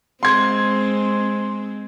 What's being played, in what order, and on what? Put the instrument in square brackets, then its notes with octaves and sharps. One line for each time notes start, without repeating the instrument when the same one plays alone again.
[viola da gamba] G#3 C4 [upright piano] C6 G#6